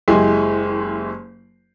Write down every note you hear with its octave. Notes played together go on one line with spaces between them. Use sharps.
F#1 G#3 E4 G4 G#5 C6